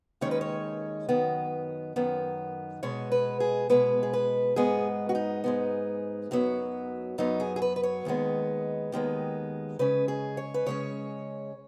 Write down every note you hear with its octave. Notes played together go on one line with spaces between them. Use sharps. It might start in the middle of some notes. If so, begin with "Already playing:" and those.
D#2 D#3 G#3 C#4 C#5
B4
C#5
F#2 D#3 B3
F#2 D#3 B3
B2 G#3 B3 C#5
B4
G#4
B2 G#3 B3 B4
G#4
B4
G#2 G#3 B3 G#4
F#4
D#4
G#2 G#3 B3
F#2 F#3 B3
F#2 F#3 B3 D#4
G#4
G#4
B4
B4
C#5
D#2 D#3 G#3 B3
D#2 D#3 G#3 B3
C#3 G#3 C#4 B4
G#4
C#5
B4
C#3 G#3 C#4 C#5